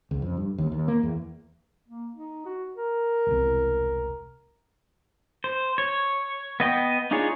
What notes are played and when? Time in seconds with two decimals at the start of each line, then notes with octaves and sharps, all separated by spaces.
0.11 C#2
0.22 F2
0.37 G2
0.58 D#2
0.72 D#2
0.88 A#3
1.03 E2
1.88 A#3
2.15 D#4
2.45 F#4
2.76 A#4
3.27 E1 C2
5.44 C5
5.78 C#5
6.60 B3 D#5 G5
7.11 D4 D#4 F4 G#4 C#5